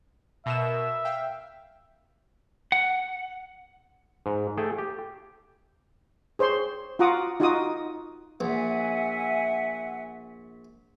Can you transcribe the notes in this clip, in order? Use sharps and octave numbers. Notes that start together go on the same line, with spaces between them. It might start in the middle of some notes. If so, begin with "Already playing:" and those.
B2 A#4 E5 E7
F5 G5
F#5
G#2
A3 G#4 A4 G5
G4
G#4 C5 C#5 C6
F4 F#4 F#5 A#5 D6 D#6
D#4 F4 F#4 D#5 D6 D#6
A#1 E5 F#5 G#5